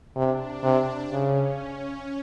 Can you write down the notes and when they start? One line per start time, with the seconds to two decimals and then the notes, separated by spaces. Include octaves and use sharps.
0.15 C3 D4
0.63 C3
1.11 C#3 C#4